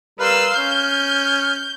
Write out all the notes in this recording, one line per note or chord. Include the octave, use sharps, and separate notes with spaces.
G3 A#4 B4 F5 C6 E6
C#4 F6 G6